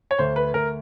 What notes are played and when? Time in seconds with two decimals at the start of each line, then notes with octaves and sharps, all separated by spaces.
0.11 C#5
0.19 D2 C5
0.36 B4
0.54 D2 A#4